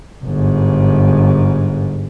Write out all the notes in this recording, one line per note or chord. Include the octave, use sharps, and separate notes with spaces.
G1 G#2